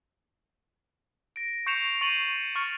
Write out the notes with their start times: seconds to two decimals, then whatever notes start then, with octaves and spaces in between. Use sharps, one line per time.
1.36 A#6 D7
1.66 C#6 G6 C7 C#7 E7 F7
2.01 C#6 A6 C7 C#7 D#7 F#7
2.55 C#6 F6 A6 C#7